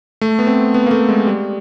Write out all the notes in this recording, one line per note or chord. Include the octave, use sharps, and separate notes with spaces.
A3
B3
C4
B3
A#3
A3
G#3
G3